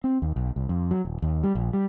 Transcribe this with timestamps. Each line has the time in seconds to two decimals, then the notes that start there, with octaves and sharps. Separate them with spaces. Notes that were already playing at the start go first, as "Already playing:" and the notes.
0.04 C4
0.22 D#2
0.36 B1
0.56 C2
0.69 F2
0.91 F#3
1.05 D#1
1.22 D#2
1.44 G3
1.55 A#1
1.73 G3